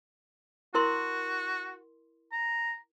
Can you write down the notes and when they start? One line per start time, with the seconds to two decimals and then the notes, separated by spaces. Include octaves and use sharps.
0.74 E4 F#4 A#4 C6
2.32 A#5